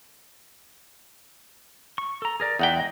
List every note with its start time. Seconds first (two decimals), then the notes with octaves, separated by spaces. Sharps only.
1.98 C#6
2.22 A4 A#5
2.40 G#4 A#4 D5
2.59 E2 D#4 E5 F#5 G5
2.77 G#3 D#5